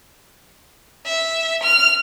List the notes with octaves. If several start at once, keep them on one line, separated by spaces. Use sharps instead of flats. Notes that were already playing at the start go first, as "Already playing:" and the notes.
E5
F6